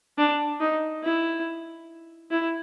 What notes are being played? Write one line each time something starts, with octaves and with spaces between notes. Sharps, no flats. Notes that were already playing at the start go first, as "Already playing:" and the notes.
D4
D#4
E4
E4